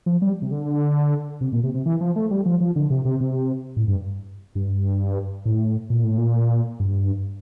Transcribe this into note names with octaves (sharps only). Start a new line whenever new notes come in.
F3
G3
C3
D3
C3
A#2
C3
C3
E3
F3
A3
G3
F3
F3
D3
C3
C3
C3
A2
G2
G2
A2
A#2
A2
A#2
G2